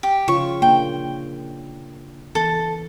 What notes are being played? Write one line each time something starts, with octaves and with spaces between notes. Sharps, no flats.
G4
C#3 F4 C#5 C#6
A#3 D4 G5
E3 B3 A4